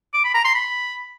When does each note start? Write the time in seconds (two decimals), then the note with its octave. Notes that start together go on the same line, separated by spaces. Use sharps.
0.14 D6
0.24 B5
0.34 A#5
0.44 C6
0.55 B5